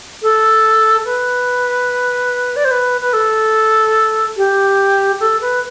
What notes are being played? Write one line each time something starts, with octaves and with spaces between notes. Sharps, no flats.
A4
B4
D5
C5
B4
B4
A4
G4
A4
B4